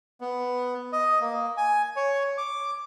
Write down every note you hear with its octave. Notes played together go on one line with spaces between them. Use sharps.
B3
D#5
A#3
G#5
C#5
D6